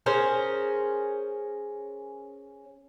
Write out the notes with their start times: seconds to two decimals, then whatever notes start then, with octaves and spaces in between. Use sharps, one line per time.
0.06 C#4 G#4 A#4 C5